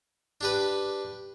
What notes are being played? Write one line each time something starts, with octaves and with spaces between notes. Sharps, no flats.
D4 G4 B4